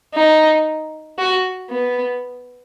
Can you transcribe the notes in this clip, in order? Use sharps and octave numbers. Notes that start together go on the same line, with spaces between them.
D#4
F#4
B3